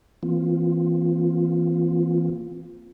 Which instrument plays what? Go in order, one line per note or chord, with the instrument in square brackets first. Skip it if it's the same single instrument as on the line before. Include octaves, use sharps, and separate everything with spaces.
[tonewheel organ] E3 A#3 C4 F4